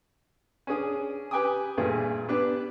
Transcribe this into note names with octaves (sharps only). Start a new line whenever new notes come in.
C#4 D4 G#4 D#6
G4 B4 G5 G#5 D6 D#6
G2 A#2 A3 G#4
B3 D4 G4 B4